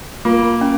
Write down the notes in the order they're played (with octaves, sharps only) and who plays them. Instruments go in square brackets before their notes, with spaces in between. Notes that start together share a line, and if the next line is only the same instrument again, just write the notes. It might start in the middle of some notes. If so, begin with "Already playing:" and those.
[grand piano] A#3 [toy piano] F4
[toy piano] C#4